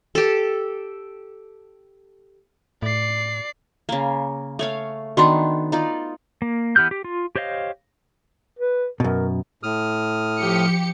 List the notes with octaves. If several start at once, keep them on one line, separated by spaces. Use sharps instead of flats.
G4 A4
A2 D5 C7
C#3 A#3
A3 C#5 F5
D#3 B3 D4 F#4 C6
D#4 F4 D5
A#3
E3 B3 G4 F6 G6
G4
F4
G4 C5 C#5 D#5 F5
B4
F#2 B2 A#4
A2 D#6 F6
F3 G4 C#7